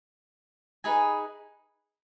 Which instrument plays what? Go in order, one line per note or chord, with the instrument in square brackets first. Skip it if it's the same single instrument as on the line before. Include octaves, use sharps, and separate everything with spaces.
[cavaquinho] D#4 G#4 B4 G#5 B5